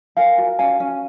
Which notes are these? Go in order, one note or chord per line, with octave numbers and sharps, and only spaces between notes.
A#4 F5 G#5
F#4
C#4 F5 G#5
C#4